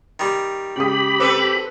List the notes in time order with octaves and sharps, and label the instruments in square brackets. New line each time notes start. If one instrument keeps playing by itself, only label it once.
[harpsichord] D#3 G3
[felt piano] C#3 G#3 D#6 [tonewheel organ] G4 B5
[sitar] C4 A4 B4